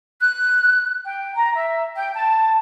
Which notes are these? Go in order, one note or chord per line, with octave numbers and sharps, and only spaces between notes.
F#6
G5
A#5
E5
G5
A5